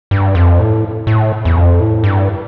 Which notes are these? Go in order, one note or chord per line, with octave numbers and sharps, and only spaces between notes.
G2
F2
A2
A2
E2
F2
A2
G2